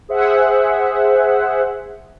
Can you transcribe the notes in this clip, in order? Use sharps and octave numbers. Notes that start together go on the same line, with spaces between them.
G#4 C5 E5 F#5